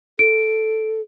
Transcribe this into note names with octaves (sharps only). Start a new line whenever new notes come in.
A4 D7